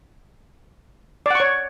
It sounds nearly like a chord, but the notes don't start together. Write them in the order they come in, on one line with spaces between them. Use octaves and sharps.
D5 F#5 C#6 C#5